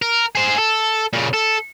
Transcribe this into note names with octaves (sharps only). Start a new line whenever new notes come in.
A#4
G#4 C5
A4
A#2 C#3
A4